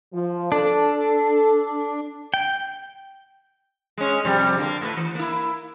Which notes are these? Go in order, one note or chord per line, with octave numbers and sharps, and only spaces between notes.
F3
D4 A4
G5
G#3 C#4
F2 C3 G3
D3 A#3
A2 A3 B4
E3
A#3 E4